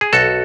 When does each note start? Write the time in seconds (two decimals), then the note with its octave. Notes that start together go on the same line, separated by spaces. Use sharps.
0.01 G#4
0.13 B1 F#4 A4